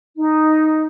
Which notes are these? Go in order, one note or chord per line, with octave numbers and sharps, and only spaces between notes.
D#4